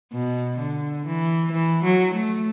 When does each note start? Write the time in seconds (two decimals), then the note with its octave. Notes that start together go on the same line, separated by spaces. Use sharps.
0.13 B2
0.59 D3
1.06 E3
1.52 E3
1.83 F#3
2.14 A3